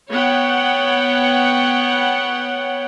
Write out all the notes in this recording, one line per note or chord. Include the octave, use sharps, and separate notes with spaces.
B3 C#5 F#5 G5